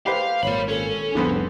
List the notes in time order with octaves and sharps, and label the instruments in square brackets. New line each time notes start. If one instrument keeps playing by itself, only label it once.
[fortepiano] G4 B4 C5 [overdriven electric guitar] F5
[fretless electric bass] G#1 A#2 [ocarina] C#5 [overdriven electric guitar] D5 B5
[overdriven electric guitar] C#4 [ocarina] A4
[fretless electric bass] F1 C2 A2 [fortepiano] D3 B3 C4